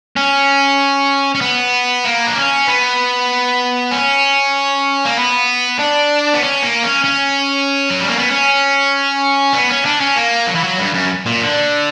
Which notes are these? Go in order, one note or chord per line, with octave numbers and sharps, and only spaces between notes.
C#4
C#4
B3
A#3
D4
C#4
B3
C#4
A#3
B3
D4
B3
C#4
A#3
C#4
C#4
F#3
G3
A#3
B3
C#4
B3
C#4
D4
C#4
A#3
F#3
E3
F#3
G2
F#2
A#2
D3